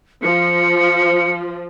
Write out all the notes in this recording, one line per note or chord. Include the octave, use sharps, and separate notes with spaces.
F3 C#7